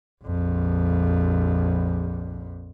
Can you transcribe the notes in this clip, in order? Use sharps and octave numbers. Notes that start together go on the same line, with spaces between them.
A#1 F2